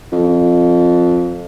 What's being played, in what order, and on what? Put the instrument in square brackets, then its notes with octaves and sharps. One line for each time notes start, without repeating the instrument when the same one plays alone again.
[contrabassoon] F2